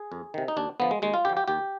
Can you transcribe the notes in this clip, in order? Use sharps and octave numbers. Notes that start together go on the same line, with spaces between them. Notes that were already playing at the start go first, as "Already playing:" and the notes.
Already playing: G#4
F2
C3 D#3
D#4
D#2 D4
D3 F3 B3
G#3
D#2 G#3
F4
D3 F3 G4
G4
D#2 G4